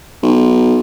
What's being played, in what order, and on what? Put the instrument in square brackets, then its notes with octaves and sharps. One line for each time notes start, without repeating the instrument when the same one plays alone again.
[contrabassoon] B1